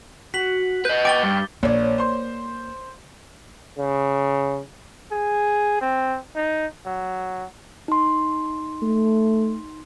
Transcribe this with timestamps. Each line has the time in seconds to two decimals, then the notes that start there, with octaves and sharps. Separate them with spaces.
0.34 F#4 B6 F#7
0.85 B4 D#5 G6
1.05 G5 B5 C#6 D6 A6 G7
1.23 G2
1.63 A#1 A#3 C#5 D5
1.98 C5 C6
3.79 C#3
5.11 G#4
5.81 C4
6.36 D#4
6.86 F#3
7.88 D#4 C6
8.82 A3